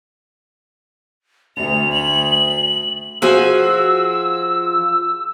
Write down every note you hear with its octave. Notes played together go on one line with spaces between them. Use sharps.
D2 F7
F#7
F3 F#4 G#4 E6